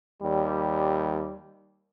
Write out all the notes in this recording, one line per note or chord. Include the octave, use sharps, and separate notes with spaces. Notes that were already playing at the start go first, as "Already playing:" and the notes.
D#2 G3